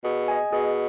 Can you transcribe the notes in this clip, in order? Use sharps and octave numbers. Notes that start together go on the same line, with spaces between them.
B2 G#4
D#5 G#5
B2 G#4